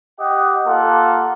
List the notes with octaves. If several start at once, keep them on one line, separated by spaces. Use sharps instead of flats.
G4 D#5 F#5
A#3 F4 A4 F#5